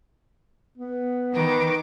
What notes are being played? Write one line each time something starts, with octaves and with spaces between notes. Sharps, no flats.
B3
D#3 D#4 B4 D6